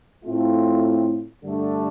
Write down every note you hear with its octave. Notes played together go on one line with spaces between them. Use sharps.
A2 A3 C4 F4
G2 D3 A3 D4